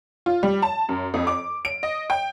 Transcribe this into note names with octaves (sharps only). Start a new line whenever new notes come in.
F4
G3
A5
F#2
F2
D6
D7
D#5
G5